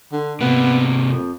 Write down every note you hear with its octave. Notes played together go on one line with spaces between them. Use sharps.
D3
C3 A#3 B3
F2